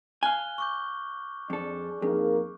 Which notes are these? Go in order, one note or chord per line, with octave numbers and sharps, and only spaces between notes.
F5 G#5 F6 F#6 G7
C#6 D6 G6
F2 D4 G#4 A4 D5
F2 A#3 D#4 G#4 A#4